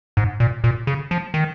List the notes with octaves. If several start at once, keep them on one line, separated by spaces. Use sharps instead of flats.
G#2
A#2
A#2
C#3
F3
D#3